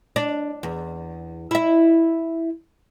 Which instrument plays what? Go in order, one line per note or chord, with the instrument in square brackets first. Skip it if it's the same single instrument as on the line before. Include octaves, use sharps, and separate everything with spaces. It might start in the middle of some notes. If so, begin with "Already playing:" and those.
[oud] D4
E2
E4 E5